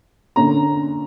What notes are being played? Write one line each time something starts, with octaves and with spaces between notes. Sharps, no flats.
D3 A#3 C#4 A#5